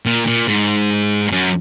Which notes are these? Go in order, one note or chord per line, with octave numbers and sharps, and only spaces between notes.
A#2
A#2
G#2
F#2